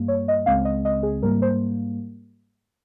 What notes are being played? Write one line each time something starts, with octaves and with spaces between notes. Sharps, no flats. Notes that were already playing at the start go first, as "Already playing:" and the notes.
Already playing: G2 G3 A#3
C#5
D#5
C#2 C#3 G#3 C4 F5
D#5
D#5
G#4
G#2 G3 A#3 A#4
C5